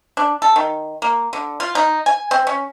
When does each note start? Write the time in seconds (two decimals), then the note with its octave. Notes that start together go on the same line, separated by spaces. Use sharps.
0.17 D4
0.42 A4
0.56 D#3
1.02 A#3
1.33 D3
1.60 F4
1.75 D#4
2.06 G#5
2.31 C4
2.47 C#4